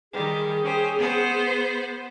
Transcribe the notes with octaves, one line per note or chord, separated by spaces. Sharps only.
D#3 G3 G#4
C#4 G4 C5
B3 B4 C5